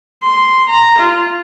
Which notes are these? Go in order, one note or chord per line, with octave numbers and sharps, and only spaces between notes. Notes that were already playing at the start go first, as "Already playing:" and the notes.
C6
A#5
F4